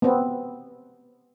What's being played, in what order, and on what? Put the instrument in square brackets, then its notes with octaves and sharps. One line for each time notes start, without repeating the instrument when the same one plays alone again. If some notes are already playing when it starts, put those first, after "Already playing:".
[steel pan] B3 C4